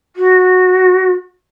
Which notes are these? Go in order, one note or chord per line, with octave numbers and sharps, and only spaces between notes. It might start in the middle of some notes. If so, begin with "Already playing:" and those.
F#4